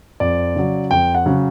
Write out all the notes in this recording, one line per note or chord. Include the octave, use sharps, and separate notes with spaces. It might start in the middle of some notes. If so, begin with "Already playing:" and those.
F2 D5
C#3 F#3
F2 G5
F#5
C#3 F#3